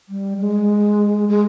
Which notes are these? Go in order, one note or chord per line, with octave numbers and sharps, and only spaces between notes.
G3
G3
G#3
G#3